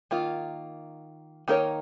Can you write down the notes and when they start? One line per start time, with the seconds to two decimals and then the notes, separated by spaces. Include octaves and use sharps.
0.11 D#3 A#3 F4
1.48 D#3 A#3 D#4 A#4 C#5